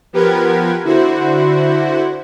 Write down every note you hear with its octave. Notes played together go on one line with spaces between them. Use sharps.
F3 B3 G4 A#4 B4 G#6
D3 E4 F#4 C5